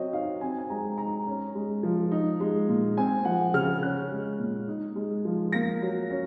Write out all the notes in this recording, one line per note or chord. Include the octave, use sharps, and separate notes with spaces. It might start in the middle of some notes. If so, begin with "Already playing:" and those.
Already playing: F#3 C4 C#5 D#5
D#4 F5
C4 G#5
G#5
G#3 A#5
D#4 A#5
C#4
G#3
F3
D#4
G#3
A#2
C4 G#5
F3 F#5
C#3 F6
C#4 F#6
G#3
A#2
D#4
G#3
F3
A#3 A#6
F#3
C#4